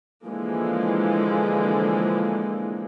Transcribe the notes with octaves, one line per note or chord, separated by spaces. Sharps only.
D3 E3 F3 G#3 A#3